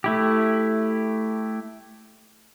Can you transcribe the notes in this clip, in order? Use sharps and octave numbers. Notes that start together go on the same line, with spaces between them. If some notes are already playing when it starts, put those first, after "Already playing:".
A3 E4 G4